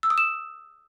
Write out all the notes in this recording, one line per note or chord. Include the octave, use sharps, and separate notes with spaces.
E6
D#6
E7